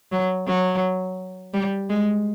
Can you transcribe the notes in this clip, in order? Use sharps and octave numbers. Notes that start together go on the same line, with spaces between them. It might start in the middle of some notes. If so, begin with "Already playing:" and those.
F#3
F#3
G3
G#3